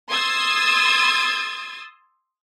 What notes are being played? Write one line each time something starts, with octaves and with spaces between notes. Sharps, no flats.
C6 D#6 E6 G#6 A6